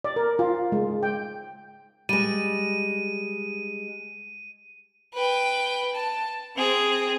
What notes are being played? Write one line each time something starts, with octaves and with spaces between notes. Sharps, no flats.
D5
A#4
F4
G#3
G5
G3 G#3 D#7
B4 G5
A5
C4 G#4